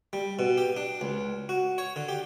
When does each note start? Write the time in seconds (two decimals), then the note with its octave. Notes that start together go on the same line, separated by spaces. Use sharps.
0.13 G3
0.39 B2
0.58 G4
0.77 D4
1.01 C#2
1.49 F#4
1.78 C#5
1.96 D3
2.08 G4